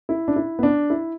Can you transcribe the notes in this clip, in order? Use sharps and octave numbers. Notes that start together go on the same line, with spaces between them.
E4
D4
E4
B3
D4
E4